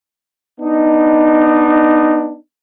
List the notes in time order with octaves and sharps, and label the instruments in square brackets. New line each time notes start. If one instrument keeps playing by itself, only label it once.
[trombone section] B3 D4 D#4